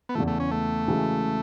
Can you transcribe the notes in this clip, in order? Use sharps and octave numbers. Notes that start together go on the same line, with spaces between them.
B3
E2 C#3 E3 A3
A3
C#4
A3
C#3 E3 G#3 C#4 F#4